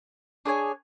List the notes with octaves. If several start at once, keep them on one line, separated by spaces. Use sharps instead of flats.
D4 G#4 C#5 G#5